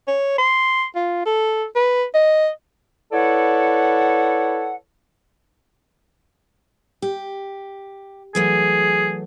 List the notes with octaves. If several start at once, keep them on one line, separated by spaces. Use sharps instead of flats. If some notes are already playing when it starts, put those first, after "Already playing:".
C#5
C6
F4
A4
B4
D#5
E4 A4 B4 C#5 D5 F#5
G4
E3 F#3 A3 G#4